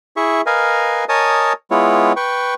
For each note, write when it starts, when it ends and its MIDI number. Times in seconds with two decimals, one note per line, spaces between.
0.17 0.41 64
0.17 0.41 68
0.17 0.41 76
0.17 0.41 85
0.46 1.04 70
0.46 1.04 71
0.46 1.04 75
0.46 1.04 77
0.46 1.04 80
1.09 1.53 70
1.09 1.53 73
1.09 1.53 75
1.09 1.53 80
1.09 1.53 81
1.09 1.53 87
1.71 2.12 56
1.71 2.12 59
1.71 2.12 64
1.71 2.12 65
1.71 2.12 73
2.16 2.54 71
2.16 2.54 79
2.16 2.54 85